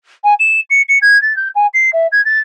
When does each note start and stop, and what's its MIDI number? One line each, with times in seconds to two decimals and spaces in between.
0.24 0.34 80
0.40 0.61 100
0.70 0.82 97
0.89 0.98 97
1.02 1.20 92
1.22 1.36 93
1.36 1.49 91
1.55 1.67 80
1.74 1.90 96
1.93 2.07 76
2.12 2.24 92
2.25 2.39 93